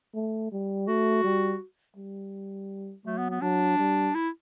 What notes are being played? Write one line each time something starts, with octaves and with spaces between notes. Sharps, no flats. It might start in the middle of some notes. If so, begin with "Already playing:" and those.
A3
G3
A3 F#4
G3
G3
F#3 A3
B3
B3
F#3 D4
G3
E4